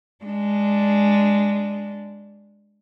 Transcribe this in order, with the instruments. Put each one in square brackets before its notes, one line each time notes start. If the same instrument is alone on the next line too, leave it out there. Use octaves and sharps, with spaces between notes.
[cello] G#3 D4